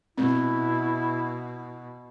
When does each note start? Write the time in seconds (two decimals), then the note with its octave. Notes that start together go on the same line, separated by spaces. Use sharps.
0.18 B2 C4 E4